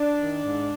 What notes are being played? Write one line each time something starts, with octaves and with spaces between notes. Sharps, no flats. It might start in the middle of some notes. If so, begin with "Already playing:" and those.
Already playing: D4
D#3
G#2